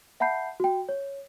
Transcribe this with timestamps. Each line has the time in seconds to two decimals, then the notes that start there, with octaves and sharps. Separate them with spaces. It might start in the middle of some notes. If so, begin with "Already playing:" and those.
0.20 E5 F#5 A5 B5 G6 C7
0.60 F#4 G5
0.89 C#5